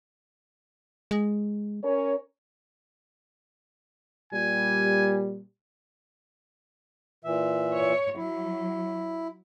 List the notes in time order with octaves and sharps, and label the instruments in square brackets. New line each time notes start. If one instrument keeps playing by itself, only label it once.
[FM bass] G#3
[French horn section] C#4 A#4 C#5
[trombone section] A#2 G3 [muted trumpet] G#5
[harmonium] A#2 E3 E5
[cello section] C#5
[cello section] F#3 [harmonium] E4